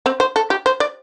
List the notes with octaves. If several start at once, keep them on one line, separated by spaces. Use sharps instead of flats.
C4
C5
A4
G4
C5
D5